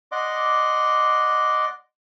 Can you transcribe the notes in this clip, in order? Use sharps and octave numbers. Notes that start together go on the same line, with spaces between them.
D5 D#5 F#5 C6 D6